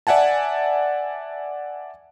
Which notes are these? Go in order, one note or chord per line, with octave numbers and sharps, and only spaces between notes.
D5 E5 F#5 G#5 A5